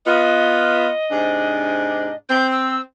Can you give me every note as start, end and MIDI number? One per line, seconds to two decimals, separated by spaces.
0.06 0.87 59
0.06 0.87 65
0.06 2.15 75
1.10 2.09 44
1.10 2.09 48
1.10 2.09 62
2.29 2.77 60
2.29 2.47 91
2.51 2.81 88